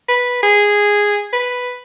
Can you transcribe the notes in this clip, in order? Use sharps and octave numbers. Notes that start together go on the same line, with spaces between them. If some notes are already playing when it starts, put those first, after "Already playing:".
B4
G#4
B4